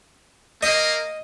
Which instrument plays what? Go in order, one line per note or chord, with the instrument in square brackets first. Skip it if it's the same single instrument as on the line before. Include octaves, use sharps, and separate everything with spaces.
[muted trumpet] A#3 [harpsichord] D#5